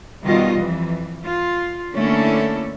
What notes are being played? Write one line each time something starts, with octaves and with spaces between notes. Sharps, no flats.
B2 D#3 G3 F4 D#5
F2 E3
F4
D3 A3 A#3 C#4 E4 A4